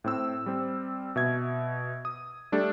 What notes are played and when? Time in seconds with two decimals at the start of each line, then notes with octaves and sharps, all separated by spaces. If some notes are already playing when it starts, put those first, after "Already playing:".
0.04 A2 C4 E6
0.46 G3 C4
1.16 B2 E5 G#6
2.05 D#6
2.52 G3 A3 D4 G4 A4